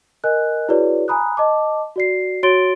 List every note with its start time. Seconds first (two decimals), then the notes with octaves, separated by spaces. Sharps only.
0.24 A#4 D#5 G#5 F#6
0.69 E4 F#4 G#4 B4 C#5 D5
1.08 G#5 A#5 B5 D#6 F#6
1.37 D#5 A5 D6
1.96 F#4 D5 C7
2.43 F#4 C#5 C6 A6 D7 G7